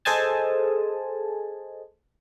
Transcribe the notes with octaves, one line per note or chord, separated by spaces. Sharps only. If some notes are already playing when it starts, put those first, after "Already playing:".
G#4 A4 C5 D#5 G#5 A5